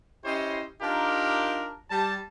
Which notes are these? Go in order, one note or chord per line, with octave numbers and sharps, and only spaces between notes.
C#4 E4 G4 C5 C#5 D#5
D4 D#4 F4 G4 A#4
G3 A5